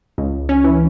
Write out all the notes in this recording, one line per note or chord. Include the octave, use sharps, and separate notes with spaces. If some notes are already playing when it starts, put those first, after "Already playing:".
C#2
C#4
E3